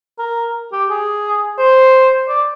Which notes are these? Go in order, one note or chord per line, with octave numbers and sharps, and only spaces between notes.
A#4
G4
G#4
C5
D5